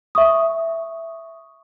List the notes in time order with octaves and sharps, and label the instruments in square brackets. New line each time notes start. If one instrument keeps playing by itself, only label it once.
[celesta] E5 C#6 D#6